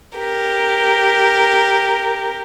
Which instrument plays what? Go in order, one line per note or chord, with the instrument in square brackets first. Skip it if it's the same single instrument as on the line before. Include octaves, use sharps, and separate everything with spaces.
[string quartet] G4 A#4